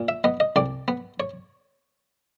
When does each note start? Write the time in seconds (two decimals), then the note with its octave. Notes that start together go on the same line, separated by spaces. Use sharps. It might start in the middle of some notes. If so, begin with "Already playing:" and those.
Already playing: A#2
0.08 E5
0.24 B3 D#5
0.40 D#5
0.56 C2 D5
0.88 B3
1.20 C#5